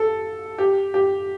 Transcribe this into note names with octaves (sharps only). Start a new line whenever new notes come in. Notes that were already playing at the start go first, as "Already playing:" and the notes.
Already playing: A4
G4
G4